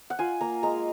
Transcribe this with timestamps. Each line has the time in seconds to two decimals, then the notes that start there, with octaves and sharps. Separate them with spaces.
0.10 F#5
0.19 F4 G#5
0.40 A#3 A#5
0.63 G#3 A#5